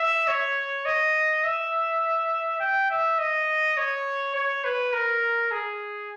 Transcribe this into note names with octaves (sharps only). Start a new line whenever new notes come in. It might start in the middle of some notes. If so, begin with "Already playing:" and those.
Already playing: E5
C#5
D#5
E5
G5
E5
D#5
C#5
C#5
B4
A#4
G#4